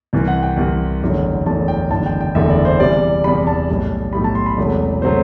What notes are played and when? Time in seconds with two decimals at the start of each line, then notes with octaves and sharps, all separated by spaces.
0.13 C2 C3 E3
0.28 F#5
0.43 G5
0.57 C2 C3 E3
1.02 F#1 E2 D3 F#3 A3
1.46 F#1 E2 D3 F#3 A3 A5
1.68 G5
1.91 F#1 E2 D3 A3 A5
2.06 G5
2.21 G5
2.35 F#1 E2 D3 A3 E5
2.50 D5
2.65 C5
2.79 E2 C3 G3 D5
3.24 E2 C3 G3 B5
3.47 A5
3.69 B1 A2 G3
4.13 B1 A2 G3 B5
4.24 A5
4.35 C6
4.46 B5
4.57 E1 E2 C3 F#3 A3
5.02 C3 F#3 A3 C5